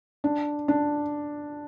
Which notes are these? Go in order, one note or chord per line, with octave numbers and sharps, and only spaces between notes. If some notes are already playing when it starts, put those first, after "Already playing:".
D4
D4